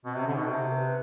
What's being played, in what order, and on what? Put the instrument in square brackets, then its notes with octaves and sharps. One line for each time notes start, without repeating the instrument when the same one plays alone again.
[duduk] B2 [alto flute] C4
[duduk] C3 [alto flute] C#4
[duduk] D3
[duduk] B2 [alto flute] D#4
[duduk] C3 [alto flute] G4
[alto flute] G4
A#4
B4